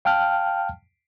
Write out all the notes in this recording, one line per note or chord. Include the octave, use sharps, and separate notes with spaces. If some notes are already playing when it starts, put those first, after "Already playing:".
F5 G5 A5 F6